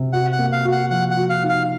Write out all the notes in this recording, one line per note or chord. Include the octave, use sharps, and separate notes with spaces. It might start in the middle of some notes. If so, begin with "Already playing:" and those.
Already playing: C3
F#4 F#5
F#5
A#3
F5
F#4
F#5
F3 F#5
F#5
F#4
F5
D#4
F5